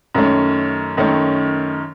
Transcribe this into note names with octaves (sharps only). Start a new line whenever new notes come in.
F#2 D#3 A3 C#4
F#2 D#3 A3 C#4